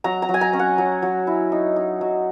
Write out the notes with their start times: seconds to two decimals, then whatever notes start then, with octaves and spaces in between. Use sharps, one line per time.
0.04 F#3 A#5
0.22 A#5
0.29 F#3
0.34 G#5
0.41 A#5
0.53 C#4
0.59 F#5
0.78 F#3
1.02 F#3
1.27 E4
1.52 D#4
1.76 D#4
2.01 F#3